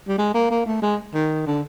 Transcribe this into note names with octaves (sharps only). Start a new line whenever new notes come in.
G3
G#3
A#3
A#3
A3
G#3
D#3
D3